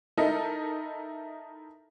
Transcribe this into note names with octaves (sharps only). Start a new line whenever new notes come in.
D#4 E4 A4 A#4 D#5